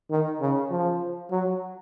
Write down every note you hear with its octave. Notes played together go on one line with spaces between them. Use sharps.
D#3
C#3
F3
F#3